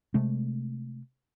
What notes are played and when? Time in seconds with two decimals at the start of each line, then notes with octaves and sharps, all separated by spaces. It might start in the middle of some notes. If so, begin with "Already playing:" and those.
0.14 C3 G#3 A3